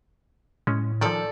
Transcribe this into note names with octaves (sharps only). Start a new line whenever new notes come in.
A2 G#3 C#4
D#3 F3 A4 D5